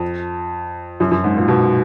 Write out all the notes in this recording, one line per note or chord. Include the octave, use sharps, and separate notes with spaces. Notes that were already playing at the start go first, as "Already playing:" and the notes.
Already playing: F2
F#2
F#2
G#2
A#2
B2